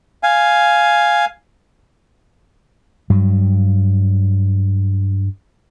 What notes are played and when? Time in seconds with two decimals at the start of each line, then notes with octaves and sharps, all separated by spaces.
0.23 F5 G#5
3.10 G2 F#3